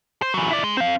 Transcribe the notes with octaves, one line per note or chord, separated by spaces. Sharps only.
C5
E3 F#3
E4 D5
G#3
C4 F5